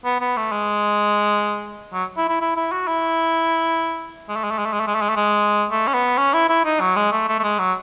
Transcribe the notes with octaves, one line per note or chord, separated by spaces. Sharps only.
B3
B3
A3
G#3
F#3
E4
E4
E4
E4
F#4
E4
G#3
A3
G#3
A3
G#3
A3
G#3
A3
G#3
A3
G#3
A3
G#3
A3
C#4
B3
C#4
E4
E4
D#4
F#3
G#3
A3
A3
A3
G#3
F#3